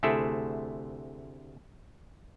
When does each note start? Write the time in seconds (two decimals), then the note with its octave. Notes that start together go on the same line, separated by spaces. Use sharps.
0.03 D2 C3 A3 E4 G#4 A4